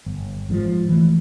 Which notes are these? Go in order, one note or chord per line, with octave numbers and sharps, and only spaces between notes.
G1
G#1 G#2 C#3 F3
E3 A3